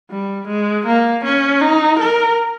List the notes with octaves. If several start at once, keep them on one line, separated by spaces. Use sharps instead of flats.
G3
G#3
A#3
C#4
D#4
A#4